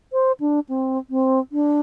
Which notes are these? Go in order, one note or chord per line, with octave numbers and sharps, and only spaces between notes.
C5
D4
C4
C4
D4